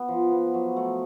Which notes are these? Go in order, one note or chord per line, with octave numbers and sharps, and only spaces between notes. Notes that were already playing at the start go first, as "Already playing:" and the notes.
Already playing: B3
F3
B3
F#3
A3